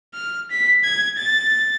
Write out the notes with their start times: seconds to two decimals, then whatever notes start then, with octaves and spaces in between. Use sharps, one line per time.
0.14 F6
0.51 B6
0.84 G#6
1.18 A6